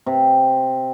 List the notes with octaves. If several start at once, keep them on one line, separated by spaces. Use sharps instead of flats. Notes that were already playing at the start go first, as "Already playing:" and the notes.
C3